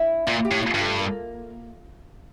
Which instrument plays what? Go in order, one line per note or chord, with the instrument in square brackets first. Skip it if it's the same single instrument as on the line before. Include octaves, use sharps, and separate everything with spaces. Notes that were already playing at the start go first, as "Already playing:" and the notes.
Already playing: [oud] E4
[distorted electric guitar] A#2 [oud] F4
[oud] G4
[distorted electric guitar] A2
[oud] F4
[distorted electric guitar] G2
[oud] A3
A#3